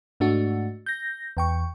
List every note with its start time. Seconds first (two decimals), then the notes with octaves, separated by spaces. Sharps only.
0.20 G#2 A3 D4 F#4
0.86 G6 A#6
1.37 E2 G5 C#6